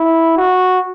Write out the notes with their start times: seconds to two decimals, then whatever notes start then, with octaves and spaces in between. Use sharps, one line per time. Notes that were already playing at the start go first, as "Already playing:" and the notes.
Already playing: E4
0.37 F#4